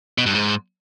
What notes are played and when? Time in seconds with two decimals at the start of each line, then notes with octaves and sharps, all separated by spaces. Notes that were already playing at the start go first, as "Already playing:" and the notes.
0.18 B2
0.26 G2
0.35 G#2